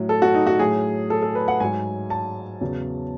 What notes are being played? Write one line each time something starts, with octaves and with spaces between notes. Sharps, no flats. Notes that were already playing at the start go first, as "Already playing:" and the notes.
Already playing: A2 F#3
A4
F#4
D#4
F#4
A2 F#3 G#4
A4
A4
B4
F#5
G#2 F#3 G#5
A5
E2 C#3 F#3